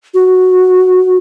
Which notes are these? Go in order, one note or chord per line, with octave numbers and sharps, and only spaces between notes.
F#4